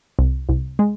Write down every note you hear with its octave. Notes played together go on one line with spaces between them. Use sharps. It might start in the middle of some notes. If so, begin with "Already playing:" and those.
C2
C2
G#3